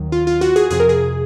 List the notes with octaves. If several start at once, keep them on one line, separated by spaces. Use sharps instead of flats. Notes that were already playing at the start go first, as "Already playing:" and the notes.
Already playing: D#2 D#3 F#3
F4
F4
F#4
G#4
F2 C3 F3 G#4
A#4
G#4